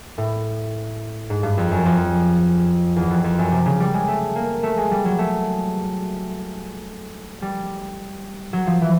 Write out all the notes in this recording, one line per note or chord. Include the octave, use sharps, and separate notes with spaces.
A2
G#2
G2
F2
F#2
F2
E2
F2
F2
F#2
C3
C#3
G3
G#3
A3
A#3
A3
G#3
G3
F#3
A3
G3
F#3
F3
E3